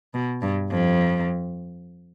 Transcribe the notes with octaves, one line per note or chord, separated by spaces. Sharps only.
B2
G2
F2